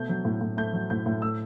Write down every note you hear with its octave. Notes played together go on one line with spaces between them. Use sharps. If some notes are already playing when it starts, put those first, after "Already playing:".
Already playing: B2 A3 G6
F#3
A2
A2
A3 G6
F#3
A2 G6
A2
A3 E6